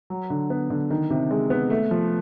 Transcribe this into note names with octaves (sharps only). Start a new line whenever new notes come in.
F#3
D3
B3
D3
D#3
C3
G#3
B3
A3
F3